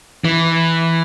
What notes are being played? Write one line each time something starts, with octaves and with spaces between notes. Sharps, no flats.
E3